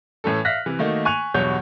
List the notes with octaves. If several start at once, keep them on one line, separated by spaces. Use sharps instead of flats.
A2 E3 C#4 A4
E5 F5 F6 F#6 A#6 B6
C3 E3
D#3 A3 A#3 D#4 F#4
G#5 C#6 F#6 D#7 F7
E2 G2 B2 F#3 C#5 G6